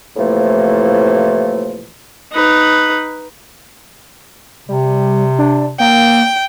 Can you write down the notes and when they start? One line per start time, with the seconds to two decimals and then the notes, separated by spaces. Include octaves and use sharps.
0.16 A2 C3 E3 F3 A3 A#3
2.32 D#4 B4
4.69 C3 G3
5.39 D4
5.80 A#3 G5